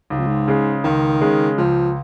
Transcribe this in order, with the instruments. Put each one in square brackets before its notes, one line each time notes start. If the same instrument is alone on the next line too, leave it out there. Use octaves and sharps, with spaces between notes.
[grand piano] C#2 [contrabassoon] G#2
[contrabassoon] F2
G#2
[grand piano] C#3 G#3
[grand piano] C#2 [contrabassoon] D#3
[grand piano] C#3 G#3
[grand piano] C#2 [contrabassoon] F3